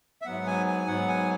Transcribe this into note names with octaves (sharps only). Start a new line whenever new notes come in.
E5
G#2 F#3 B3 F#5
G#5
G#5
G#2 F#3 B3 F#5
G#5